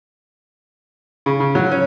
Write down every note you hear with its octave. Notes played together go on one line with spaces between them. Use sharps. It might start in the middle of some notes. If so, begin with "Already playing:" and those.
C#3
C#3
F#3
C#4